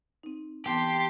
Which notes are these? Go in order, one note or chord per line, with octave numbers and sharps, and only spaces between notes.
C4 D#4
E3 B3 G4 A5 C6